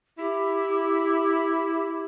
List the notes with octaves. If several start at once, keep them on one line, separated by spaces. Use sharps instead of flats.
E4 G4